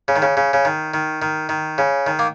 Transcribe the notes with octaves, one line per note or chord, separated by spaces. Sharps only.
C#3
D#3
C#3
C#3
C#3
D#3
D#3
D#3
D#3
C#3
D#3
A#3